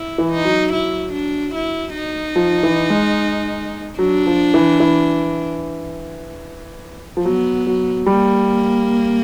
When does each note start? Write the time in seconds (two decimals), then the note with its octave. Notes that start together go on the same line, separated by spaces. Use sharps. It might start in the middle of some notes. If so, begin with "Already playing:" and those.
Already playing: E4
0.18 E3
0.32 D#4
0.45 F#3
0.72 E4
1.13 D4
1.55 E4
1.95 D#4
2.36 F3
2.63 E3
2.90 G#3
3.99 F#3 D4
4.27 F3
4.54 E3
4.80 E3
7.17 F3
7.25 F#3 B3
7.67 F#3
8.06 G3 A#3